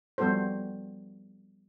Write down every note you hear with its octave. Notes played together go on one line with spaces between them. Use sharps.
F3 G3 B3 F#4 A4 C5